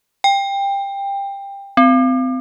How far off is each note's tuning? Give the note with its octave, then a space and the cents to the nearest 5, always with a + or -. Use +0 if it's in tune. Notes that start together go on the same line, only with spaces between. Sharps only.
G5 +20
C4 -30